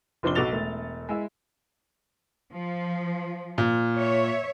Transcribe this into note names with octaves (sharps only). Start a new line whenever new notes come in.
F1 F3 D4 C6 G7
B1 F#4 A4 D6 A6 F7
E1 A3
G#3 E4 E5
F3
A#2
C#5 E5